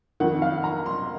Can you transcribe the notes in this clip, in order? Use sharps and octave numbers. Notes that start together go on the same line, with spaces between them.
F2 D#3 F#5
F5
A#5
C6